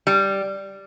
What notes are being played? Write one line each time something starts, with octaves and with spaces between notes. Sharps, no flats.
G3